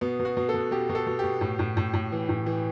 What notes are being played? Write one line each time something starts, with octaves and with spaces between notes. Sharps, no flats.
B2 B3
B2
F#4
B2
A4
B2
B2 G4
B2
A4
B2
B2 G4
A2
A2
A2
A2
E3
A2
E3